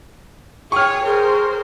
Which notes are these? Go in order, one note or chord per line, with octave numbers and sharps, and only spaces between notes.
G#4 C#5 G5 C#6 F6
G#4 A#4 C5